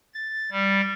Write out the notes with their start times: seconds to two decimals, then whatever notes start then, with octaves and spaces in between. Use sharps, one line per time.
0.14 A6
0.51 G3